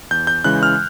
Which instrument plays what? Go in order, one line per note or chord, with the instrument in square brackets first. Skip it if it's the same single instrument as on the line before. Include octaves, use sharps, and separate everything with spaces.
[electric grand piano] E2 G6
G6
C#3 E3 G#3 F#6
F6